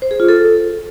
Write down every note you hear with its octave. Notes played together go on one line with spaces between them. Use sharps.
C5
G#4
F4
A4